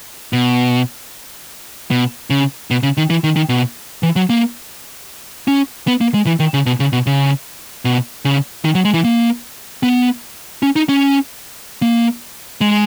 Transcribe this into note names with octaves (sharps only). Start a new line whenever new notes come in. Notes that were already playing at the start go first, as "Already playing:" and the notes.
B2
B2
C#3
B2
C#3
D#3
E3
D#3
D#3
B2
E3
F#3
A#3
C#4
B3
A#3
G#3
E3
D#3
C#3
B2
C#3
B2
C#3
B2
C#3
D#3
F#3
G#3
E3
A#3
B3
C#4
D#4
C#4
A#3
G#3